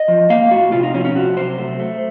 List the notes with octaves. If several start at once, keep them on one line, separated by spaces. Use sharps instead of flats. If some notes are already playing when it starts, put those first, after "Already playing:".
Already playing: D#5
F3
A#3 F5
A2 F#4
C3 F4
D#4
F3 C#4
C4
C#4
C3 F#4
F#3 C5
A3
A3